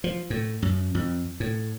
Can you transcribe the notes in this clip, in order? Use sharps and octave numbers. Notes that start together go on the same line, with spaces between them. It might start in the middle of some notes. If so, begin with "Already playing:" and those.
F3
A2
F#2
F2
A2